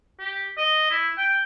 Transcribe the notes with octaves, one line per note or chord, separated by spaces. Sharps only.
G4
D#5
E4
G5